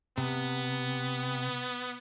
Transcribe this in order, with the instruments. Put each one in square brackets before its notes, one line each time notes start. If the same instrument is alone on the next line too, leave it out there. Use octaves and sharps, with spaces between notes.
[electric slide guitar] C3 [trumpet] B3